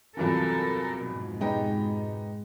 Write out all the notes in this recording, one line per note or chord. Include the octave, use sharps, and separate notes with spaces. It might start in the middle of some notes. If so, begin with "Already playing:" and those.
E2 G2 C3 E3 F#3 F4 A4 A#4
F2 G#2 B2
G#3 B3 D#4 G4